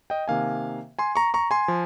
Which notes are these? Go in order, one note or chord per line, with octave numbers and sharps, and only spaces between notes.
D#5 G5
C3 D#3 A#3 F5 G#5
G#5 C6
A#5 C#6
A#5 C#6
G#5 C6
F3